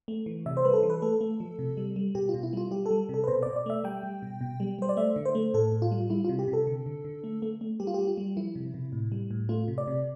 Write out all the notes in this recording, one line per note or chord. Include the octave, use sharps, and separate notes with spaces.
A3
E3
C3 E5
C5
G3 B4
A4
E3
B4
A3 A4
A3
F3
C3
G3
G3
B2 G4
F4
B2
E4
G3 F4
G3 G4
A4
G3
C3 A4
B4
B2 C5
B2 D5
D5
A3 E5
G3 G5
G3
B2
B2
G3
G3 C5
D5
A3 E5
D3
C5
A3
A2 A4
A2
F4
G3
G3 E4
C3 F4
G4
C3
A4
D3
D3
D3
A3
A3
A3
G3 G4
F4
G4
G3
F4
G3
F3 E4
C3
C3
A2
G3
A2
A3 F4
C3
D5
C3